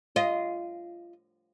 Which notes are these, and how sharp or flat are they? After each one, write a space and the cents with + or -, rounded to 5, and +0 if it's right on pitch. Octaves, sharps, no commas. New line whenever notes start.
F4 -15 D#5 +0